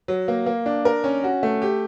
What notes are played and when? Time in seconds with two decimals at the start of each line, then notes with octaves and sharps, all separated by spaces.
0.08 F#3
0.28 A#3
0.46 A#3
0.66 D4
0.85 A#4
1.04 C#4
1.24 F#4
1.43 A3
1.62 G4